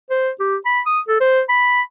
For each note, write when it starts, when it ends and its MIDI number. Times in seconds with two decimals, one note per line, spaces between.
0.10 0.30 72
0.40 0.56 67
0.66 0.80 83
0.86 1.00 87
1.08 1.19 69
1.20 1.41 72
1.49 1.82 83